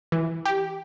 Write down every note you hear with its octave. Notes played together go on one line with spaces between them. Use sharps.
E3
G4